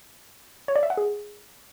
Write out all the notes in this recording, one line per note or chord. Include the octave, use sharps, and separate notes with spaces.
C#5
D5
E5
F#5
G#4